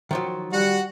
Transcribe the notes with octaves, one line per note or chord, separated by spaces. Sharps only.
D#3 F3 F#3
G3 F#4 F#5